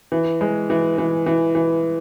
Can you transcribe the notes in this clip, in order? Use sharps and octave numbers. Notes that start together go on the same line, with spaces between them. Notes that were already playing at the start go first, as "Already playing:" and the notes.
E3
G#3
E3
E3
E3
E3